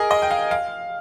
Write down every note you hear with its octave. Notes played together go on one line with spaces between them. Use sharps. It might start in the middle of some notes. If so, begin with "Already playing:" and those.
Already playing: G#4 A#4 D#5
D#5
G5
F5
F5